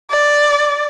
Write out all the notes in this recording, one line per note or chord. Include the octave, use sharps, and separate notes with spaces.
D5